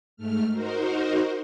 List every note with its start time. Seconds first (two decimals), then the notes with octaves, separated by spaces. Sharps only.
0.16 G#2 A3 F6
0.52 D#4 F#4 A#4 C5